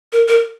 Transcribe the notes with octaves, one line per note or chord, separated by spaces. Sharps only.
A#4
A#4